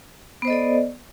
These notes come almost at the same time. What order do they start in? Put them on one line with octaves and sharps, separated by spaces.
B3 C5 D#5 A4 D5